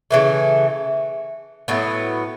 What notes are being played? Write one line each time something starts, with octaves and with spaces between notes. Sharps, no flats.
C#3 E3 A3
A2 F#3 B3